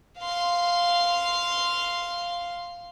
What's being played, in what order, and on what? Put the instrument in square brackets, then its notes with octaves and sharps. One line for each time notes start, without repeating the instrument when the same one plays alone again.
[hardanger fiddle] F5 C6